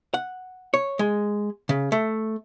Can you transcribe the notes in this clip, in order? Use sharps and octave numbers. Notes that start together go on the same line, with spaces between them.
F#5
C#5
G#3
C#3
A3